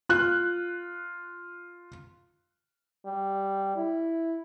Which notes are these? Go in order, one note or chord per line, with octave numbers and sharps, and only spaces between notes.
F4 F#6
G3
E4